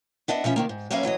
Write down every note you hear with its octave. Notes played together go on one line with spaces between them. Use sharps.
B3 D4 D#5 E5 F#5
B2 F3 C#4 E5
C3 D#3 A#3
G#2
F#3 A#3 C#4 B4 E5 F5
E3 F#3 C#5 D#5